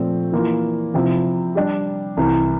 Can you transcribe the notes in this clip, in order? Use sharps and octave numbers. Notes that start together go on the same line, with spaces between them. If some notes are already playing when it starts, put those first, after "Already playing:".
Already playing: A#2 F3 A3 C4
E3 A#3 F4
C3 F3 C4 E4
G3 D4 G4
C2 C3 E3